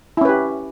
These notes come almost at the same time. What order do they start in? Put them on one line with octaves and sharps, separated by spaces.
E4 C#4 B4 G4